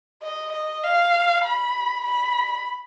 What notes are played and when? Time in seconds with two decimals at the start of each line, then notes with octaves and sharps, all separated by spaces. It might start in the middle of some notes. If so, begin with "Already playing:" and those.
0.22 D#5
0.53 D#5
0.83 F5
1.45 B5
2.05 B5